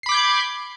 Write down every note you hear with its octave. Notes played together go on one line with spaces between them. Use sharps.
B5 D6 G6 G#6 C7